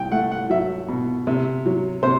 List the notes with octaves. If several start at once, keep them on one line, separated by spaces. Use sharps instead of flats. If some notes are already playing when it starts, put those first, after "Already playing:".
Already playing: C2 G5
A3 F#5
F#5
F#3 E5
B2
C3
F#3
C3 C5